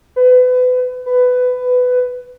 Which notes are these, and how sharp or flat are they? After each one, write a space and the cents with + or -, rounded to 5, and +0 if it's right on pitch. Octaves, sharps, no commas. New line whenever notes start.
B4 +30
B4 +15